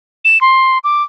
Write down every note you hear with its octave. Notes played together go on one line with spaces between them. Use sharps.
E7
C6
D6